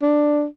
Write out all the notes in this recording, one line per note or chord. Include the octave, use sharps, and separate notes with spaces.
D4